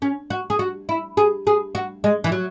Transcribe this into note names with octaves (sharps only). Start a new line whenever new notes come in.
C#4
F#4
G#4
F#4
E4
G#4
G#4
F#4
G#3
E3
F#3